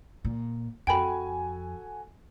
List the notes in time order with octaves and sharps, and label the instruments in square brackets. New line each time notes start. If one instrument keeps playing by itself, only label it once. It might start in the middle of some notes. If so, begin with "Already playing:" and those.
[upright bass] A#2
[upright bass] F2 [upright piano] F#4 A4 G#5 [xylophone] G5 B5